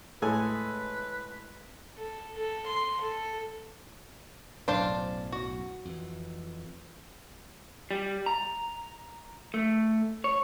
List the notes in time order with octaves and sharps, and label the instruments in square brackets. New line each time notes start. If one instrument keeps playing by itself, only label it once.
[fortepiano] A2 A4 G#5 [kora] G#3 [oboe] B4
[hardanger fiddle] A4
A4
C6
A4
[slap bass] B1 F#2 A2 [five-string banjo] D4 C5 F5
[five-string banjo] F#4
[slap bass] F2 E3
[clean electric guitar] G3
A#5
A3
C#5